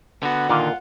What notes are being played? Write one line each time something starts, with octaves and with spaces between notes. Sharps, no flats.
D3 B3 F#4 F#5
A#2 D3 D#3 A#3 F4